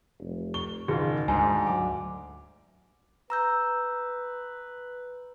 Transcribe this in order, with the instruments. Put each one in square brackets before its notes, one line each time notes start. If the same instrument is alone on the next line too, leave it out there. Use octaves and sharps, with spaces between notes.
[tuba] F1
[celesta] C#6 [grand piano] G7
[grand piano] F#1 F4 [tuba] D#3 [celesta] G#4
[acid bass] D2 [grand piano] G#2 [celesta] G#5
[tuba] F#3 [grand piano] D6
[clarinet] B4 [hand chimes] A#5 E6 G6